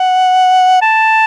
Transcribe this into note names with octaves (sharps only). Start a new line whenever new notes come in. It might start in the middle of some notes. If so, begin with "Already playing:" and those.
Already playing: F#5
A5